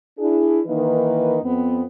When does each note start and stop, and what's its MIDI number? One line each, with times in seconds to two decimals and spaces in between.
0.19 0.59 62
0.19 0.59 64
0.19 0.59 68
0.67 1.38 51
0.67 1.38 52
0.67 1.38 58
0.67 1.38 63
0.67 1.38 71
1.43 1.82 41
1.43 1.82 59
1.43 1.82 60